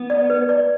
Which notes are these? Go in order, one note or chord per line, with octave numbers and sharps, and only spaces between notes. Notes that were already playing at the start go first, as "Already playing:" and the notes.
Already playing: B3
D5
B4
D5